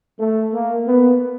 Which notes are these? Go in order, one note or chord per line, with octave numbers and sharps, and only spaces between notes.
A3
A#3
B3